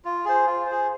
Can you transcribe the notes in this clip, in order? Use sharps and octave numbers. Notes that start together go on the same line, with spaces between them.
F4
G#4 C5
F4
G#4 C5